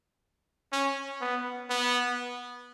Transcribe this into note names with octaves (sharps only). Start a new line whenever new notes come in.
C#4
B3
B3